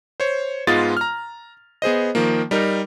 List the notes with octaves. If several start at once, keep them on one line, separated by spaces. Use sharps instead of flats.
C5 C#5
G#2 G#3 B3 F4 D#6 A6
A#5 F6
B3 G#4 C5 D#5
D#3 F3 A#3
G3 D#4 A#4